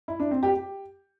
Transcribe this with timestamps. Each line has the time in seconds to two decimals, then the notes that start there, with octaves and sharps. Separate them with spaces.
0.08 E4
0.20 D4
0.31 C4
0.43 G4
0.54 G4